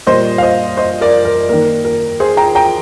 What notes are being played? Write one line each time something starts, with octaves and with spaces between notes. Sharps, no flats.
A#2 G3 A#3 C5 D#5
F5
C5 D#5
C5 D#5
A#4 D5
A#4
D#3 A#3 A#4
A#4
G#4 C5
G5 A#5
G5 A#5